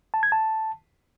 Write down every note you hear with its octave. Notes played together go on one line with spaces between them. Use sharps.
A5
G#6
A5